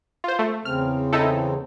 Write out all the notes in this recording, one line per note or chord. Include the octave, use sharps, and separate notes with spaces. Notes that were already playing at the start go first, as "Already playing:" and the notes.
F4 C5
A3
E2 C#3 C4 F6
D#4 E4 A4